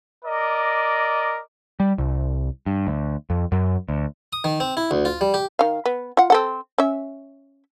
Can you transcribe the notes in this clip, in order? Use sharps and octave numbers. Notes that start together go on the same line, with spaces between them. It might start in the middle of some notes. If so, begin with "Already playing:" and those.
A#4 D5 D#5 D6
G3
C2
G2
D2
F2
F#2
D2
D#6
D#3
C4
E4
D2
F4
G3
G4
D#3 F5
B3
F4 F#5
C4 A4 F#5
C#4 E5